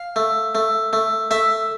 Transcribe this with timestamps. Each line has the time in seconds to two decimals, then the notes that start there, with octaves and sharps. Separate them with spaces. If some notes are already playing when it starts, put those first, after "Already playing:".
Already playing: F5
0.16 A3
0.55 A3
0.93 A3
1.31 A3 E5